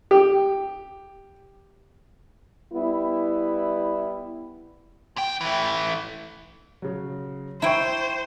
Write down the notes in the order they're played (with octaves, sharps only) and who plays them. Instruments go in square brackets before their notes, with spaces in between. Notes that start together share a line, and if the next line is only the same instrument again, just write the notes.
[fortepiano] G4
[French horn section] G3 B3 E4
[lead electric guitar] A#2 G5
E3 A3
[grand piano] C#3 F#3
[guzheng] E4 G5 [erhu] C5 [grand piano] A#5 C#6